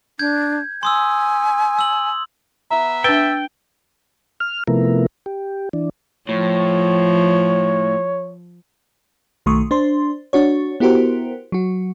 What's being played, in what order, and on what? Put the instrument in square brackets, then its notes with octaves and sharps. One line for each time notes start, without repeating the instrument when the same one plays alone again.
[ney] D4 [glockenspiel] G6 G#6
[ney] G#5 [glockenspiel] C6 D#6 E6
[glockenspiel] E6 F#7
[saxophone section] B3 E5 [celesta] A#5
[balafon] D4 B4 [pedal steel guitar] G5 [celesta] E6 A6 G7
[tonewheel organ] F6
C3 F3 A3 B3 E4 A#4
G4
E3 D4
[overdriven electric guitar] A2 [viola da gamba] F3 [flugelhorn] C#5
[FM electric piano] B1 D#3 A3 C6 C#6 D#6
D4 C5 C6
D4 F#4 C#5
B3 E4 F#4 G4 A#4 C5
F#3 F#4